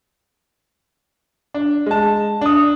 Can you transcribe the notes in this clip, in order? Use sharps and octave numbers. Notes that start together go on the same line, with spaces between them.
D4
G#3 A5
D4 D#6